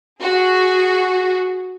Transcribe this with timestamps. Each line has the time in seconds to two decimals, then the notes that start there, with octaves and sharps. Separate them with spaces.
0.22 F#4 G#4